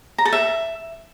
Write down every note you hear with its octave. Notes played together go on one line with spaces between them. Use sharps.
A#5
A4
E5